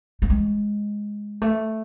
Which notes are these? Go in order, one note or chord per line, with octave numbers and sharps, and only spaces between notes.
A3
G#3
A3